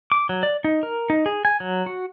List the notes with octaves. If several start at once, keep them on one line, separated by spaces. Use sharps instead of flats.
D6
F#3
D5
D#4
A#4
D#4
G#4
G#5
F#3
F#4